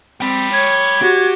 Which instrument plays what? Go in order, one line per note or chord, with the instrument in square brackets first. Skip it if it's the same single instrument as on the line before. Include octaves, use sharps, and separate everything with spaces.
[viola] C4 [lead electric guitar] G5 B5
[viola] C#5 [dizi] G#6
[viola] F#4 [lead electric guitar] G4